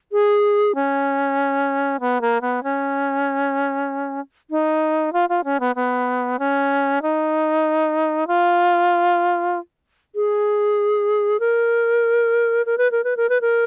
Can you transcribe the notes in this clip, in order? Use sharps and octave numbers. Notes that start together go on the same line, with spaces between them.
G#4
C#4
B3
A#3
B3
C#4
D#4
F4
F4
C#4
B3
B3
C#4
D#4
F4
G#4
A#4
A#4
B4
A#4
B4
A#4
B4
A#4